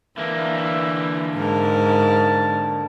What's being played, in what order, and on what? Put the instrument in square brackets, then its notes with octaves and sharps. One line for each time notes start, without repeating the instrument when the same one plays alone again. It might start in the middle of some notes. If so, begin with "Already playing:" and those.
[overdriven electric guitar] D3 A#3 [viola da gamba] E3 [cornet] E5
[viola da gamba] G#2 A#4 [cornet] A5